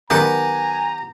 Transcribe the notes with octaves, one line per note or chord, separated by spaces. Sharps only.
D#3 F#3 B3 G4 F#5 G#5 A#5